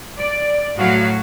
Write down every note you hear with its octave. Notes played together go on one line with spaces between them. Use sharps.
D5
A2 F#3 F#4 F5